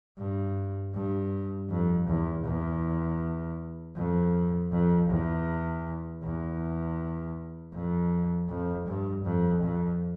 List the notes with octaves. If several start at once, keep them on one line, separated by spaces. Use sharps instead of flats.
G2
G2
F2
E2
E2
F2
F2
E2
E2
F2
F2
G2
F2
F2